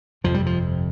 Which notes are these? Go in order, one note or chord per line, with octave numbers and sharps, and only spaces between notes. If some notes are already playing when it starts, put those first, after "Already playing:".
G1 F2 C3 F3
G3
F3